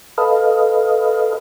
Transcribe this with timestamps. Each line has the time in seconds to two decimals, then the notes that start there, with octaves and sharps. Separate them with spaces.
0.18 A4 B4 D#5 F5